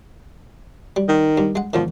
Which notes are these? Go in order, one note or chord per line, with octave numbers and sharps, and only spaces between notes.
G3
D#3
G2
G#3 F#5
E2 G#2 D#3 F3